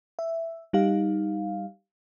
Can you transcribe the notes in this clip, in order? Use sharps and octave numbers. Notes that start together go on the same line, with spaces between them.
E5
G3 D#4 G4 F5